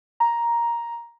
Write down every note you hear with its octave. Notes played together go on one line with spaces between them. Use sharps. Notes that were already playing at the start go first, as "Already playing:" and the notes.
A#5